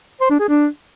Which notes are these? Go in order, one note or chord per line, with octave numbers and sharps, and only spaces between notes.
C5
D4
G#4
D4